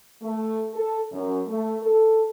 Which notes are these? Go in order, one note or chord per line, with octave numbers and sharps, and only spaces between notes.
A3
A4
F#2
A3
A4